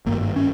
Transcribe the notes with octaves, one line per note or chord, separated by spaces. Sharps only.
G#1 G2 A#3
C#4